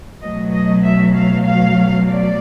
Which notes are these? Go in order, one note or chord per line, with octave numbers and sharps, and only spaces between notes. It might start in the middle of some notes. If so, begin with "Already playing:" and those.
B2 F#3 A3 D#5
D#5
E5
F5
F5
D5